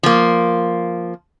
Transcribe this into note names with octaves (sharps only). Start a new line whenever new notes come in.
F3 A#3